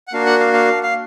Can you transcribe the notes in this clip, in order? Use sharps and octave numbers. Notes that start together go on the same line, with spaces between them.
F#5
A#3 D4 F#4 F5
F#5
F5
F5
F5